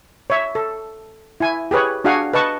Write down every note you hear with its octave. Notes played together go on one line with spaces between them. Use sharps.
C#5 E5
A4
E4 G#5
G4 G#4 B4 C#5
D4 F#4 G#4 F5 F#5 G#5
B4 D#5 A5 C#6